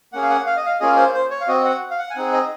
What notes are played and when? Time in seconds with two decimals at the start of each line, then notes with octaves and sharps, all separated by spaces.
0.13 A#3 C#4 G#4 F#5
0.22 F5
0.30 F#5
0.46 F5
0.57 D#5
0.65 F5
0.80 A#3 C#4 F4 G#4 D#5
0.97 C5
1.14 C5
1.31 C#5
1.41 F5
1.48 C4 F#4 D#5
1.65 F#5
1.91 F5
1.98 F#5
2.10 G#5
2.15 C4 D#4 G#4 F#5
2.33 D#5